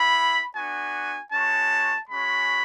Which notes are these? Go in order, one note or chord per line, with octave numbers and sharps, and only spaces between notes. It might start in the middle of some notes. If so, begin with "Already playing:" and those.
Already playing: B3 E4 B5
B3 D4 F#4 G#5
G#3 C#4 F#4 A5
G#3 C#4 F#4 B5